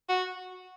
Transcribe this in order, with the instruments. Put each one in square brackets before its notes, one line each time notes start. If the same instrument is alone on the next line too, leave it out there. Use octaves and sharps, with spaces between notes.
[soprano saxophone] F#4